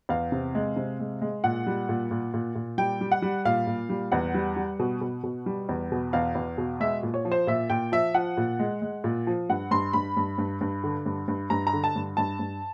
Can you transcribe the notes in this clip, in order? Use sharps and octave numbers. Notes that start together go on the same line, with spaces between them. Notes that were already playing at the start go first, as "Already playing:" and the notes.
E2 F5
C3
G#3
C3
G#3
G#3
A#2 F#5
G3
A#2
A#2
A#2
A#2
G3 G5
G3
F#5
G3
A#2 F5
A#2
G3
E2 F#5
G3
G3
B2
B2
B2
G3
E2
B2
E2 F5
E2
B2
G#3 E5
A#2
C#5
F3
C5
A#2 E5
A#2 G5
F3 E5
F3 F#5
A#2
G#3
G#3
A#2
F3
G2 F#5
G2 C6
G2 B5
G2
G2
G2
D3
G2
G2
G2 A#5
A#5
D3
A5
G2
G2 A5
G2